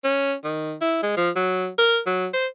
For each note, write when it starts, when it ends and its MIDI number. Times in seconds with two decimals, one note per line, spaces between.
0.04 0.34 61
0.44 0.74 51
0.81 0.98 64
1.03 1.13 56
1.17 1.30 53
1.36 1.68 54
1.78 2.00 70
2.06 2.27 54
2.33 2.47 72